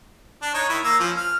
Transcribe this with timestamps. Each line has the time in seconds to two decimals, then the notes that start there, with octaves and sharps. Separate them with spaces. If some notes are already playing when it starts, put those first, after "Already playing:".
0.42 D4
0.54 D#4 C#5
0.69 D#3 E4
0.84 A#3 E6
1.00 F3 C#4
1.17 F6